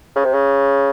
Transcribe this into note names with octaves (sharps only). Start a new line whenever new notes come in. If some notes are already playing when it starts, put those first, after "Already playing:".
C#3
C3
C#3